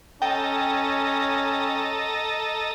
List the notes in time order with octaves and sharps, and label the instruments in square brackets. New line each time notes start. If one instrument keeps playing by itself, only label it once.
[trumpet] C#4 [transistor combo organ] A4 D#5 A#5 [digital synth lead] G5